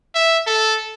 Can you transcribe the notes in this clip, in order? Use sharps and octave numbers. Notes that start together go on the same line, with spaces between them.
E5
A4